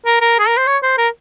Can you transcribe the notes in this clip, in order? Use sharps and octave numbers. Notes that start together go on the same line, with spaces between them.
A#4
A#4
G#4
A#4
C5
C#5
C5
A#4